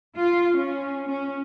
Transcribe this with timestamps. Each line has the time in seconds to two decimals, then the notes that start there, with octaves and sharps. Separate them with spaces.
0.15 F4
0.56 C#4
1.09 C#4